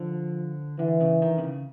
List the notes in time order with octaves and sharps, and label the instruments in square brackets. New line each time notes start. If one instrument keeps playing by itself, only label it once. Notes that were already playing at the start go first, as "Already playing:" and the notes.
Already playing: [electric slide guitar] D3 [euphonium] F3
[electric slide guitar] D3 [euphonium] E3
[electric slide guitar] C#3
D#3
C3
C#3